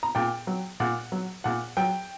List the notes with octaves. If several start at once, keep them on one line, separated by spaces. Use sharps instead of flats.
A#5
A#2 G5
F#3
A#2 F#5
F#3
A#2 F#5
F#3 G5